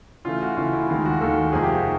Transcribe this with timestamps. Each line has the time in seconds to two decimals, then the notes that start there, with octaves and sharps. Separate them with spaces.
0.25 C#3 E3 A3 F4
0.42 F#4
0.57 C#3 E3 A3 F4
0.73 E4
0.89 D#2 D#3 G#3 F4
1.06 F#4
1.21 D#2 D#3 G#3 A4
1.52 F2 C3 F3 A#3 D#4 G#4
1.64 G4
1.75 F#4